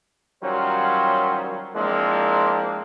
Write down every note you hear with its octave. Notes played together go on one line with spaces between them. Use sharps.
D#3 F#3 G3 C#4 F4 C5
F3 G#3 A#3 C4 D4 E4